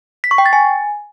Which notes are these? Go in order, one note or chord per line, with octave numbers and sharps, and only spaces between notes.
B6
C#6
G5
A6
G#5